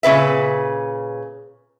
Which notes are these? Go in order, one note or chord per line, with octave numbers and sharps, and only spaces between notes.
A#2 C#3 B4 E5